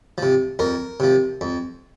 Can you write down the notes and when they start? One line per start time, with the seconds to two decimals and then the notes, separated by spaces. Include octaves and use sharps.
0.18 C3 F3
0.59 F2 A#4
1.00 C3 F3
1.41 F2